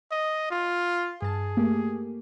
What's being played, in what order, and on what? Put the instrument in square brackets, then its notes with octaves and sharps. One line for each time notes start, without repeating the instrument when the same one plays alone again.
[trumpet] D#5
F4
[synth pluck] G2 A5 [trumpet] G#4
[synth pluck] A3 A#3 G4